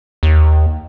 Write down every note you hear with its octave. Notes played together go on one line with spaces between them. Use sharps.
D#2